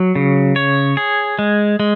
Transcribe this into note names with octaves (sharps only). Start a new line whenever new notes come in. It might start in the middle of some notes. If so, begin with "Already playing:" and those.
Already playing: F#3
C#3
C#5
G#4
G#3
G#3